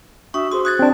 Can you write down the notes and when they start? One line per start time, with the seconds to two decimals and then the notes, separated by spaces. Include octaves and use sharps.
0.34 D4 F#4 E5 C#6 D#6
0.52 F#4 G#4 C5 C6 D#6
0.65 D#6 F#6 G#6 A6
0.79 C4 D4